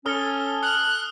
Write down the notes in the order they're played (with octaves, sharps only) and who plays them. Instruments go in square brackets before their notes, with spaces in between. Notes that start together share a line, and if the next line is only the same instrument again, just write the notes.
[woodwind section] C#4 [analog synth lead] A4 [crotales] D#6 F6 G7
[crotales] D#6 F6 [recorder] F#6